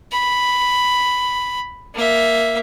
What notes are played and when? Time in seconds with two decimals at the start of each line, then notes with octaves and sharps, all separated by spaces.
0.12 B5
1.94 A#3 E5